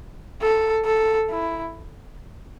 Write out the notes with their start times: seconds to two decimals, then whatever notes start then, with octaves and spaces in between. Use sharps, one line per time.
0.42 A4
0.86 A4
1.30 E4